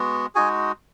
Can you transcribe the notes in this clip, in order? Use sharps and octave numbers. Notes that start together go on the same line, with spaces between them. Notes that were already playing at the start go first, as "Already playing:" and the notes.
Already playing: G#3 B3 F#4
G#3 D#4 F#4 G#4 G#5